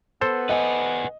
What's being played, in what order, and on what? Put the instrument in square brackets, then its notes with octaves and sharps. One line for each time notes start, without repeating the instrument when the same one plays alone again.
[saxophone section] B3 [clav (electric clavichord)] A4 C5
[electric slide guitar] B4 F#5 G#5 [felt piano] D#5